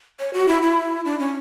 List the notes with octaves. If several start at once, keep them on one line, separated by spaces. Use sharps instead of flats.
C#5
F#4
E4
E4
D4
C#4